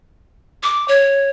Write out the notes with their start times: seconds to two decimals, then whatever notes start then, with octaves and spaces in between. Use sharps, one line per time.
0.63 D6
0.88 C#5